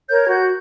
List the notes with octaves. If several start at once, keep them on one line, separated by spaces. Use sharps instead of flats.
A#4 C#5 G6
G#6
F#4 G6